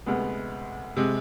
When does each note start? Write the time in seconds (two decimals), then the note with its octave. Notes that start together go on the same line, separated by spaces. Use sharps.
0.06 D2 C3 G#3 B3
0.96 C3 G#3